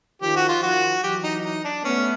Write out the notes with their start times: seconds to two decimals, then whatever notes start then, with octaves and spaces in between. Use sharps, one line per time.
0.21 D#3 F3 G4
0.36 F#4
0.49 F4
0.62 D#3 F3 F#4
1.03 E3 F#3 G4
1.24 D#4
1.44 D#4
1.64 D4
1.84 A3 B3 C#4